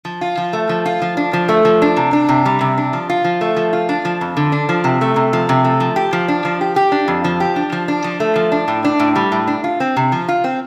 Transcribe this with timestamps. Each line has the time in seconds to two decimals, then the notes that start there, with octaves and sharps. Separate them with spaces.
0.05 F3
0.21 F4
0.37 F3
0.53 A3
0.69 F3
0.86 F4
1.02 F3
1.17 D4
1.33 F3
1.49 A3
1.65 F3
1.82 D4
1.96 C3
2.13 D4
2.29 C3
2.46 G3
2.61 C3
2.78 D4
2.93 F3
3.10 F4
3.24 F3
3.41 A3
3.56 F3
3.73 F4
3.89 D4
4.05 F3
4.21 F2
4.37 D3
4.52 D4
4.69 F3
4.84 C3
5.01 A3
5.16 C3
5.33 F3
5.49 C3
5.64 A3
5.80 F3
5.96 G4
6.13 F3
6.28 D4
6.45 F3
6.61 G4
6.76 G4
6.92 D4
7.08 F2
7.24 F3
7.40 G4
7.56 D4
7.72 F3
7.88 D4
8.04 F3
8.20 A3
8.36 F3
8.52 D4
8.68 A2
8.84 D4
9.00 A2
9.16 G3
9.32 A2
9.47 D4
9.64 F4
9.80 C4
9.97 C3
10.12 F3
10.28 F4
10.44 C4